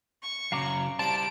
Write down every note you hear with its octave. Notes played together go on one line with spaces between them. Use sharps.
C#6
C#3 F#3 F5 A#5 D6
G3 C5 A5 D7